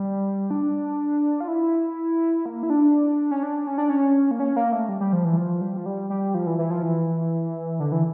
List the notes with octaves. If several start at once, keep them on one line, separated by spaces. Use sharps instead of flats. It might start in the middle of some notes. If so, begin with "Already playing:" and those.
Already playing: G3
D4
F4
E4
A#3
E4
D4
C#4
D4
C#4
D4
C#4
A#3
C#4
A#3
A3
G3
G3
F3
E3
F3
G3
F3
G3
G3
F3
E3
E3
F3
E3
D3
E3